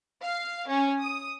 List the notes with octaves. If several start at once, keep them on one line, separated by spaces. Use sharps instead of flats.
F5
C#4
D#6